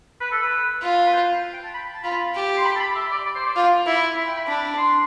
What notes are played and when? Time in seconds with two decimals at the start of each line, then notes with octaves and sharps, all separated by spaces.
0.21 B4
0.31 A4
0.42 B4
0.82 F4
1.06 B4
1.13 C5
1.53 G5
1.64 A5
1.74 B5
1.94 A5
2.04 F4 B5
2.35 G4
2.57 C6
2.65 B5
2.76 A5
2.80 B5
2.95 E5
3.11 D5
3.25 D5
3.36 C5
3.46 D5
3.56 F4 C6
3.87 E4
4.17 B5
4.27 G5
4.37 B5
4.48 D4 B5
4.77 C6